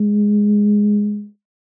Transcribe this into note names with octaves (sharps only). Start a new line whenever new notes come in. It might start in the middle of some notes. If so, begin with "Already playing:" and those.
Already playing: G#3